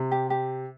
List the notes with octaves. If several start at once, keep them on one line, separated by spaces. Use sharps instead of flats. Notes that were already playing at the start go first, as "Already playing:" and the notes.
Already playing: C3
G4
G4